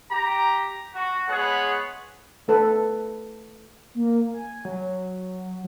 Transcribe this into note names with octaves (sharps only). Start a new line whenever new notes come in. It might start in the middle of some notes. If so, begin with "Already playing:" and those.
G4 A#5
F#4
G#3 B3 G#4 B4 C#5 F#5
A3 A4 B4
A#3
G#5
F#3